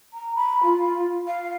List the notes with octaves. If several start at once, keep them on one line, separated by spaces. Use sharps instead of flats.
A#5
B5
F4
F5